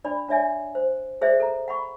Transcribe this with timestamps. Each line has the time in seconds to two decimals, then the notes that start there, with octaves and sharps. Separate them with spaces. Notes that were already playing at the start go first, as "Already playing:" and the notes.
0.04 D4 D5 B5
0.28 D4 C#5 D5 E5 G#5
0.75 C5
1.21 G#4 C5 D5 E5
1.40 A4 A#5
1.68 F#5 B5 C#6